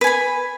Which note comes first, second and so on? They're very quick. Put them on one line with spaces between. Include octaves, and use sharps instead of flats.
B4 G#5 B5